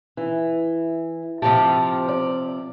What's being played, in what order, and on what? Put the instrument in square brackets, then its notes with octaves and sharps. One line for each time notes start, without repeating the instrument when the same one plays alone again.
[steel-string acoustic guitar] E3
[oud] C3 F3 G4 [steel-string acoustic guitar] A5
[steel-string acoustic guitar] D5